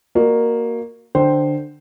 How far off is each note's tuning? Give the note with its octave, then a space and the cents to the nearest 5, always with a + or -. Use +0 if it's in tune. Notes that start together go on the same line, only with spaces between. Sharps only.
A#3 +0 F#4 +0 D5 +45
D3 +15 C5 +0 G5 -5